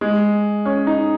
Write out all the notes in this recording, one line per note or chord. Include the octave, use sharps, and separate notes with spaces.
G#3
C#4
D#4